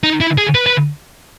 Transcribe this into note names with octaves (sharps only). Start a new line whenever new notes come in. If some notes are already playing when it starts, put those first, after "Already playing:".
D#4
E4
G#4
B4
B4